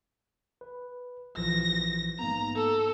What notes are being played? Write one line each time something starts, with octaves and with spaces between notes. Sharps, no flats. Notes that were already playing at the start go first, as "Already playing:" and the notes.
B4
A#1 E3 F3 A#6
G#2 A#3 B3 A#5
A4